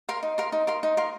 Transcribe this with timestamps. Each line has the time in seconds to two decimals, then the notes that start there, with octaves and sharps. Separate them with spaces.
0.09 A#4 F5 C6
0.23 D#4
0.38 A#4 F5 C6
0.52 D#4
0.67 A#4 F5 C6
0.83 D#4
0.97 A#4 F5 C6